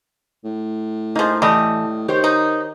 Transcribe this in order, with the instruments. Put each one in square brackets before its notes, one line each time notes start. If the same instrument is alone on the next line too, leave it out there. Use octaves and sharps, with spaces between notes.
[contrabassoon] A2
[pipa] F3 A#3 [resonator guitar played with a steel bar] D#4 G#4
[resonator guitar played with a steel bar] E3 A3 [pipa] G3 D#5
[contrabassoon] D#3 [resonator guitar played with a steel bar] G4 C5 C#5
[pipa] D#4